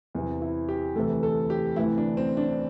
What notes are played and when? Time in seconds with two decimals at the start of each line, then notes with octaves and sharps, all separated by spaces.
0.15 E2 C3 E3
0.41 E4
0.69 G4
0.95 D2 C3 E3 A4
1.23 A4
1.50 G4
1.76 D2 C3 E3 E4
1.98 D4
2.17 C4
2.37 D4